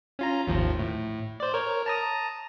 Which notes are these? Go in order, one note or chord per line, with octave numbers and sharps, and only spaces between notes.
C#4 F4 A#5
G#1 D#2 F3
A2
C5 D5
A#4 C#5
A5 A#5 D#6